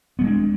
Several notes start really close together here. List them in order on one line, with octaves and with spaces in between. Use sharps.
B3 G3 G#3 D4